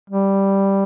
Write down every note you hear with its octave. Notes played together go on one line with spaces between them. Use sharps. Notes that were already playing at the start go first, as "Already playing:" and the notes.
G3